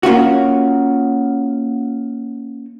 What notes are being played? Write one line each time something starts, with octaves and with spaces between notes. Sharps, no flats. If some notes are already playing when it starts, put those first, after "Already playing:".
A#3 C#4 F4 F#4